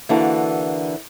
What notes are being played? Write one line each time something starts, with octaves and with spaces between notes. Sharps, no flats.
D3 E3 A#3 D4 F#4 A4